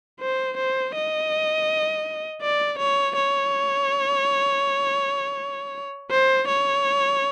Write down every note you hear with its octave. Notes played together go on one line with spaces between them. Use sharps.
C5
C5
D#5
D5
C#5
C#5
C5
C#5